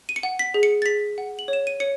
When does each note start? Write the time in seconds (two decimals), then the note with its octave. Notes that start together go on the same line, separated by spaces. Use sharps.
0.09 D#7
0.16 C#7
0.23 F#5
0.39 B6
0.54 G#4
0.63 C#7
0.82 A6
0.86 G#4 B6
1.18 F#5
1.39 F#7
1.48 C#5
1.53 E7
1.67 D#7
1.80 C#5 C#7